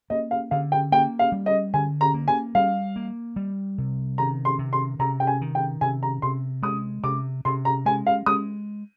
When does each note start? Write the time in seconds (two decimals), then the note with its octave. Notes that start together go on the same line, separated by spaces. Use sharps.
0.10 A#3 D#5
0.31 F5
0.51 D3 F5
0.72 G5
0.92 A#3 G5
1.19 F5
1.32 G3
1.46 D#5
1.74 D3 G#5
2.01 A#5
2.14 A#3
2.28 G#5
2.55 G3 F5
2.96 A#3
3.36 G3
3.78 C3
4.18 D#3 A#5
4.45 C6
4.59 C3
4.73 C6
4.99 C3 A#5
5.20 G5
5.27 G#5
5.41 D#3
5.55 G5
5.81 C3 G#5
6.03 A#5
6.22 C3 C6
6.63 G#3 D#6
7.03 C3 D6
7.45 C3 C6
7.65 A#5
7.86 G#3 G#5
8.07 F5
8.26 G#3 D#6